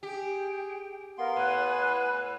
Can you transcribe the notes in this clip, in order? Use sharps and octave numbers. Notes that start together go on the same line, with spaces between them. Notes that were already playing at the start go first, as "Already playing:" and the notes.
G4 G#4 G5
B3 A#4 F5 C6
A2 B4 G#5 F#6